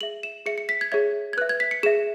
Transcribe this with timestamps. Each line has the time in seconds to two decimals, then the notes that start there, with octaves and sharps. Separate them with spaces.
0.01 G#4 E5 F#7
0.23 E7
0.46 G#4 E5 C#7
0.58 C#7
0.69 B6
0.81 G#6
0.92 G#4 C#5 E5 G#6
1.33 G#6
1.37 B4 E5 F#6
1.49 G#6
1.60 B6
1.71 C#7
1.83 G#4 E5 E7